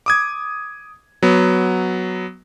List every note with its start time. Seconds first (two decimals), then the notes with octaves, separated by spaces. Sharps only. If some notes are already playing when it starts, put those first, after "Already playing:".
0.06 D6 D#6 G#6
1.23 F#3 B3